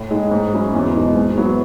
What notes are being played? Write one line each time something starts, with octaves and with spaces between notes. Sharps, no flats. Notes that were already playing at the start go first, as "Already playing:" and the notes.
Already playing: A2
G#3 D#4
G#2
F#3 C#4 E4
E2
B2 G#3 D#4
G#2
F#3 B3 E4